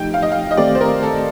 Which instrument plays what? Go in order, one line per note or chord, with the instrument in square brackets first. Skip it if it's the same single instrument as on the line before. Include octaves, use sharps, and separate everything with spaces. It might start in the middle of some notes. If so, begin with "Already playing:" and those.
Already playing: [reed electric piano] F3 A3 D#4 G4 [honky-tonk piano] G5
[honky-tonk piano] F5
D#5
F5
D#5
[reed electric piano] D#3 A3 C4 G4 [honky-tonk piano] D5
[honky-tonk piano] C5
A#4
A4